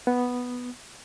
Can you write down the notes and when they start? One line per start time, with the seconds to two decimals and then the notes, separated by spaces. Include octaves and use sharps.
0.07 B3